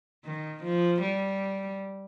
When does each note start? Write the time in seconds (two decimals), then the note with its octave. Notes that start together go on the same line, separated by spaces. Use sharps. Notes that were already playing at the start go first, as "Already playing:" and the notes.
0.25 D#3
0.63 F3
1.02 G3